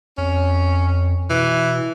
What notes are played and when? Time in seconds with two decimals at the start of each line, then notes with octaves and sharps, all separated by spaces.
0.18 F2 C#4
1.30 B2 E3